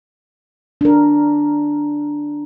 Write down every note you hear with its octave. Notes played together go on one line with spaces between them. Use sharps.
D4 A#4